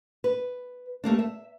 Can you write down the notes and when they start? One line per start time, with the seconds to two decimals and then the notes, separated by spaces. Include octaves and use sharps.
0.24 B4
1.04 G3 A3 A#3 D4
1.19 E5